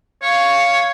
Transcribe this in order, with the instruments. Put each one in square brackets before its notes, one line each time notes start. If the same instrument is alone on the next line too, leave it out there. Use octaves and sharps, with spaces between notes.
[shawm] C#5 [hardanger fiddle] F5 C#6